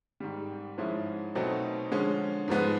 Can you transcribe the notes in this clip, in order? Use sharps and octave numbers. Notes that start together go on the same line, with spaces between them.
G#2 D#3 G3
G#2 F3 G#3 C#4 E4
B2 F#3 A3 C4 D#4
D3 F3 G#3 C#4
G#2 F3 G#3 B3